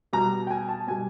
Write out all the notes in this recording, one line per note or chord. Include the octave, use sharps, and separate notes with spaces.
B2 G3 A#5
G5
G#5
A5
B2 G3 G#5